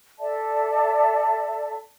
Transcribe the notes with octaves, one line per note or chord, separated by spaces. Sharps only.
A4 D5 E5 A5